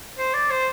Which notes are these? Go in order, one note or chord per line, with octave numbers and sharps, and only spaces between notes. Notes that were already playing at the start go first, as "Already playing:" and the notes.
C5
D5
C5